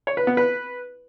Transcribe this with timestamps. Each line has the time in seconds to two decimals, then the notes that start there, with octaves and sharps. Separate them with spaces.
0.07 C#5
0.17 B4
0.27 B3
0.37 B4